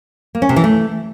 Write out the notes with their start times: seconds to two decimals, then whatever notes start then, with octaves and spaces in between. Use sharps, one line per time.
0.35 A#3
0.42 C#4
0.49 C3
0.56 E3
0.64 A3